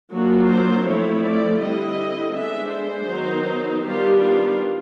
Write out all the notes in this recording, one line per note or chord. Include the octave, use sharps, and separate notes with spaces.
F#3 A#3 D4 F4 F#4
C5
F3 A3 C4 E4 C#5
D5
D3 G3 C4 E4 D#5
G#3 B3 D4 E5
C5
D#3 F#3 B3 D#4
D#3 G3 B3 D4 F4 G4
F4